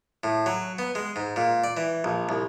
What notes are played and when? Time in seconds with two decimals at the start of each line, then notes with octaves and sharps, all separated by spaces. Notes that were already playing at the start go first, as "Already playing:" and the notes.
0.24 A2
0.46 F#3
0.79 B3
0.95 G#3
1.16 G#2
1.36 A#2
1.64 D5
1.77 E3
2.04 A#1
2.29 C2